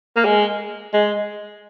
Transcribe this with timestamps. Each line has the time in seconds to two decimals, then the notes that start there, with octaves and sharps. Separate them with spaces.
0.16 A#3
0.25 G#3
0.93 G#3